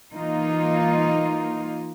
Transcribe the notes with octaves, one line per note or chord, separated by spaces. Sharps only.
E3 A#3 D#4 F4